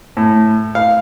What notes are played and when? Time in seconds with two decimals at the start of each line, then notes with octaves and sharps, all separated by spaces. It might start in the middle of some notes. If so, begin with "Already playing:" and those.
0.17 A2
0.75 F5